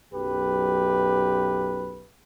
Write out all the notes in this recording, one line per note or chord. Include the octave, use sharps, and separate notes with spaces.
B1 F#2 G4 B4